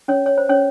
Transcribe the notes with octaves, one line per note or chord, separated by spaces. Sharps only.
C#4 C#5
C#5
C5
C#4 C#5